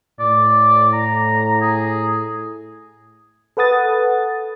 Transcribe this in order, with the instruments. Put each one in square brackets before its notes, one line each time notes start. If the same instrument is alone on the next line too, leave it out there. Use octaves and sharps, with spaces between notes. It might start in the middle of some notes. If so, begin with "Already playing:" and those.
[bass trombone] A2 [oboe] D5
[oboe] A#5
G#4
[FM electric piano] A4 B4 F#5 D#6 A6